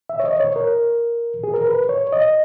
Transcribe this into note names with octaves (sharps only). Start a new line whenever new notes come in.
E5
C#5
D#5
C#5
A#4
G#4
A#4
B4
C#5
D#5